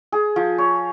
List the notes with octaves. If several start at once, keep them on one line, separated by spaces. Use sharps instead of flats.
G#4
F3
C#5